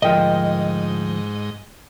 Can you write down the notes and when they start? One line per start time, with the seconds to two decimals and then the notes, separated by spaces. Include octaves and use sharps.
0.02 D2 G#2 F3 A#4 D#5 G5